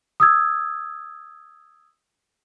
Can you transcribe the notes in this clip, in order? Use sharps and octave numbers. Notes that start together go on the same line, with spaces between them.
D#6 E6 G#6